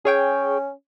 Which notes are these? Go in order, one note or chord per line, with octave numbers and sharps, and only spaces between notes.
C#4 G#4 C#5 G5